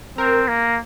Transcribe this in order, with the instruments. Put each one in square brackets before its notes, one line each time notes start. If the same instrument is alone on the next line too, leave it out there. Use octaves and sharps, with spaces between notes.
[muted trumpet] C4 [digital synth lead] A#4
[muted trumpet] A#3